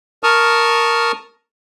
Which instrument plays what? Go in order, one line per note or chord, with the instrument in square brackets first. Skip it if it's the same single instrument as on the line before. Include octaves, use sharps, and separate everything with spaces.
[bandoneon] A#4 A5 C#6 D#6 F6